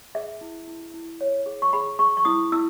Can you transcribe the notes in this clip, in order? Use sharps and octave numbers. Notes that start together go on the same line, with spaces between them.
G#4 E5
E4
E4
E4
C#5
G#4
C#6
G#4 B5
G#4 C#6
C#6
E4 D#6
E4 E6